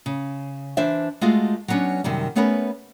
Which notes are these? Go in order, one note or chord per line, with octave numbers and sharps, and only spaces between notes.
C#3
E3 D4 C5 E5
G#3 A3 F4 F#4 G#4
F#3 G3 B3 C#4 D4
F#2 C3 D#3 G3
A3 B3 C#4 G#4 A#4 B4